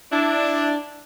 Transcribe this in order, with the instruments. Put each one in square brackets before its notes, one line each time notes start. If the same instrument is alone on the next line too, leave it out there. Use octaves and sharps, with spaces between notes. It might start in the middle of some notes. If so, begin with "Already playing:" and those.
[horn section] D4 [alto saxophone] E4